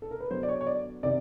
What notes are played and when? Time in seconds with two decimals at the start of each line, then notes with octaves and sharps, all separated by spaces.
0.02 A4
0.11 A#4
0.20 B4
0.30 D3 F#3 B3 C5
0.43 D5
0.49 C#5
0.61 C#5
0.67 D5
1.03 C3 D#3 D5